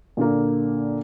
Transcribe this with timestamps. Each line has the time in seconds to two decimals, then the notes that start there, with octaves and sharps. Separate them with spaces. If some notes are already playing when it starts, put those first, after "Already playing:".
0.17 A#2 D3 A#3